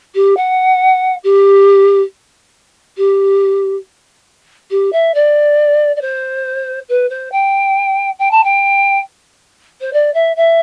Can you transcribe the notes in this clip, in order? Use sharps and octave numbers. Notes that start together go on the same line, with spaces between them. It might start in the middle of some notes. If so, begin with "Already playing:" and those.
G4
F#5
G4
G4
G4
E5
D5
D5
C5
B4
C5
G5
G5
A5
G5
C5
D5
E5
E5